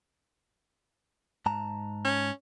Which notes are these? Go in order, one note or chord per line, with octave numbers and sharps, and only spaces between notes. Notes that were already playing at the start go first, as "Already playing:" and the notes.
G#2 A5 A#5
C#4